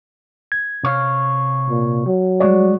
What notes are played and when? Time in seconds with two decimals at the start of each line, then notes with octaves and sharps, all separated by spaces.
0.52 G#6
0.83 C3 C#5 F5
1.69 A#2
2.06 F#3
2.40 G3 G#3 F#4 C#5 D5